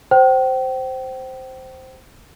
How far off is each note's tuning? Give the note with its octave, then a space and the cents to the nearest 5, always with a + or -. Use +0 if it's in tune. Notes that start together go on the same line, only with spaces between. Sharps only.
C5 +0 G5 -35